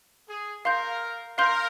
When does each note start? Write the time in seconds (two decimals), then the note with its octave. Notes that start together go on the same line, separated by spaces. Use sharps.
0.28 G#4
0.65 A#4 F5 C6 G6
1.38 A#4 F5 C6 G6